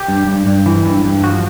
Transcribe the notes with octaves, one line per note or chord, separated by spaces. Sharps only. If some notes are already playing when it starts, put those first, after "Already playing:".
Already playing: G4
G2
G2
G2
E3
G2
G2
F3 F#4